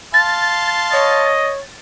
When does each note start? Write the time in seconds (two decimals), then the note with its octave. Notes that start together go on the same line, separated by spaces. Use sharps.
0.14 F5 A5 C6 A6
0.93 C#5 D#5